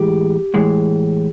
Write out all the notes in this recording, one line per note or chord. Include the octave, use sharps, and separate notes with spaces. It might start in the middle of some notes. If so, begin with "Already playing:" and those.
Already playing: A2 E3 G#3 G4
A2 E3 G#3